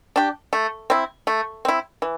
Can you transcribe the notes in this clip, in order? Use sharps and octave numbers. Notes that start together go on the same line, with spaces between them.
D4 G4
A3
C4 E4
A3
C4 E4
E3